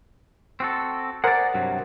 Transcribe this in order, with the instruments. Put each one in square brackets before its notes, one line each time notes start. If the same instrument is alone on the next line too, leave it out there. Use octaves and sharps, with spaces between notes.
[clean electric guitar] C4 F#4 A4
[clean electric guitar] G#4 D5 [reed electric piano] A#4 C5 F#5
[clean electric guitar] G2 C3 F#3